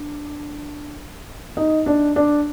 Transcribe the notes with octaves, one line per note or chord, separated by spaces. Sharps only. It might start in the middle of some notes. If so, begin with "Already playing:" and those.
Already playing: D4
D#4 D#5
D4 D5
D4 D5